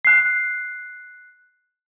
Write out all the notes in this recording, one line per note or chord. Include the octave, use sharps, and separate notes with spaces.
F#6 C7